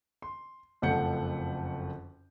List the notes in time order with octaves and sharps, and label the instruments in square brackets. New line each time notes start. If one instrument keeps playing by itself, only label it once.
[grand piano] C6
F#1 F2 A3 F#5 G6 C#7